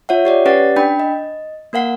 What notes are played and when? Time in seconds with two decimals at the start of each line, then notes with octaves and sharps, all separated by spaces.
0.09 F4 C#5 E5 F#5
0.25 G4 C#5 D5
0.46 C#4 G4 B4 D5 F#5 A6
0.76 D4 G5 B5
1.00 D#5
1.73 A#3 A#4 F5 F#5 C7